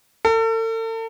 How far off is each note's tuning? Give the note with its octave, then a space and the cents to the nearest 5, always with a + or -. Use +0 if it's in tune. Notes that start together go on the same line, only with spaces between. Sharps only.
A4 +40